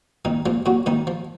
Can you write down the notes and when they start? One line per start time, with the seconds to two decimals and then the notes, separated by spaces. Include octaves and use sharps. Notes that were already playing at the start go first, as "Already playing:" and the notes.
0.25 A#2 D#3 D#4
0.46 A#2 F3 F4
0.66 A#2 F#3 F#4
0.86 A#2 D#3 D#4
1.07 F3